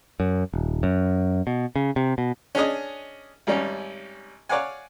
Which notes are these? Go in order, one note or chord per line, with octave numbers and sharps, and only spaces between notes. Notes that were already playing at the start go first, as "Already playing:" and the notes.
F#2
D#1
F#2
B2
C#3
C3
B2
C#4 D4 G#4 D#5
G#1 G3 C#4
C#5 D5 F5 F#5 G#5